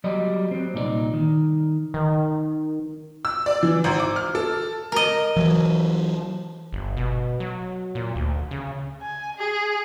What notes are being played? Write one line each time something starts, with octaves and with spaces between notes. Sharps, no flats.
F#3 G3 D5 D#5
F#3 C4
C2 A#2 D#4 F#4 D5
D#3
D#3
E6
D5
E3
G#1
D6
F6
A4
A#4 D#5
E3 F#3
G1
B2
F#3
A#2
D2
C#3
G#5
G#4